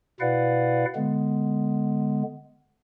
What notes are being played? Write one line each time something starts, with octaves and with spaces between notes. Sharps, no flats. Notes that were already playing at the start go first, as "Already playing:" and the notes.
B2 E4 B4 D5 F5 F#5
D3 G#3 B3